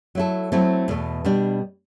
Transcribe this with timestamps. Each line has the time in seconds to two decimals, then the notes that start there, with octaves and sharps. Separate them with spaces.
0.15 F#3 A3 E4 A4
0.52 F#3 A3 C4 E4 A4
0.88 E2 B2 A3
1.25 B2 G3 D4